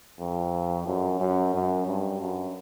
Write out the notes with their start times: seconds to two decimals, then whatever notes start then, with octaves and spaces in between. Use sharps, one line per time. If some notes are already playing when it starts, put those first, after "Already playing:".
0.19 F2
0.86 F#2
1.20 F#2
1.54 F#2
1.87 G2
2.21 F#2